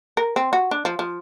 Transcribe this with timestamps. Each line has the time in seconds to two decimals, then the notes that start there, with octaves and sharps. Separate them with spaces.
0.17 A#4
0.36 C4
0.53 F#4
0.71 D4
0.85 F3
0.99 F3